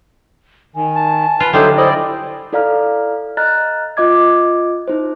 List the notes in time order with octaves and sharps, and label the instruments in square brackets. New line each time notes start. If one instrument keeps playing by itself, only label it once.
[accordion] D#3 [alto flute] G#5
[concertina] A5
[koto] F4 [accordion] B4
[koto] D3 G3 [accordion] F#3 [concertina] D#4 E4 C5 [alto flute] A4
[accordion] E4 D5 [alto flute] C5 [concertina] D#5
[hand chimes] E4 A4 D5 F5 A#5 F6
D#5 A#5 F6 F#6 A6
F4 D#5 D6 G#6
D#4 E4 C5